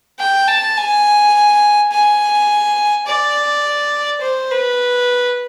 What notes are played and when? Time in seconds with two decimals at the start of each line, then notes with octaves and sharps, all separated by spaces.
0.20 G5
0.48 A5
0.77 G#5
1.92 G#5
3.07 D5
4.22 C5
4.51 B4